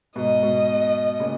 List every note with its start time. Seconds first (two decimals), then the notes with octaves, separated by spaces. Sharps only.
0.16 G#2 B2 D#5
0.42 G#2 B2
1.20 A#2 C#3